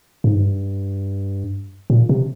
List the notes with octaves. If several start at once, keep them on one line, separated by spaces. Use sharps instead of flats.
G#2
G2
A#2
C3